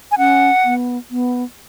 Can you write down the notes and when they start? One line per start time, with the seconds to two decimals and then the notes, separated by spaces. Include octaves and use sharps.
0.12 G#5
0.17 C#4 F#5
0.64 B3
1.11 B3